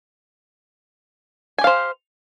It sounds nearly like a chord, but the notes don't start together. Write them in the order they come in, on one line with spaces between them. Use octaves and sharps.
G#5 G4 F5 C5